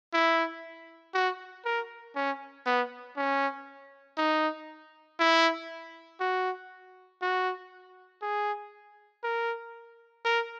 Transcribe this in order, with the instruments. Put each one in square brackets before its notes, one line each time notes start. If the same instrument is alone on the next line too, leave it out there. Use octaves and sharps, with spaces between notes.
[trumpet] E4
F#4
A#4
C#4
B3
C#4
D#4
E4
F#4
F#4
G#4
A#4
A#4